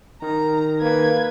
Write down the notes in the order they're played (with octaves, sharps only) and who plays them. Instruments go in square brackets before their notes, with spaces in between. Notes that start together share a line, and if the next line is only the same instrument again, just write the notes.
[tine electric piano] D#3 A#4 [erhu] A#5
[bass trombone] A#3 [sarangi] B4 [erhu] G#6